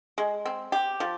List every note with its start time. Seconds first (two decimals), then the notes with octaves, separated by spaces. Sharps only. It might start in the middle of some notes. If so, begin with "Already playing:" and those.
0.18 G#3
0.45 C4
0.72 G4
1.00 F3